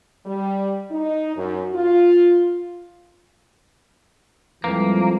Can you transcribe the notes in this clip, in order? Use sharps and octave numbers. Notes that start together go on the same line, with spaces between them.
G3
D#4
F#2
F4
F2 E3 F3 G3 G#3 A#3 B4